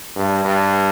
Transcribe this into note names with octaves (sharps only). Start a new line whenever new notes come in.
G2
G2